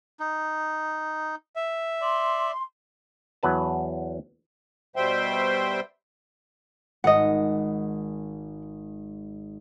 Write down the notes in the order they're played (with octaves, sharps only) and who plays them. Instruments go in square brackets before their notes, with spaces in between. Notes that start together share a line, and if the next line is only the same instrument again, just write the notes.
[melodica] D#4
[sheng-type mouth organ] E5
[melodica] D5 [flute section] C6
[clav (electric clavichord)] E2 F#3 B4 A5
[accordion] B2 G3 C5 E5 G5 C6
[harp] G#1 [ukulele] D#5 F#5